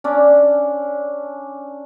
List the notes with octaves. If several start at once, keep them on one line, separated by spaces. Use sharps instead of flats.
C#4 D4 D5